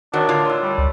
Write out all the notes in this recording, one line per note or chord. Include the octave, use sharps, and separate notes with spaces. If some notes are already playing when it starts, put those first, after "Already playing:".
D#3 C4 D4 F#4 A#4 C#5 D#5
A2 D3 F4
C#5 A5 E6
G3
C#2